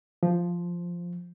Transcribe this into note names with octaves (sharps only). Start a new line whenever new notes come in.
F3